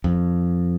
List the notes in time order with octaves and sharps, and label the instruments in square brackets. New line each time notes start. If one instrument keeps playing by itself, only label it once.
[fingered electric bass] F2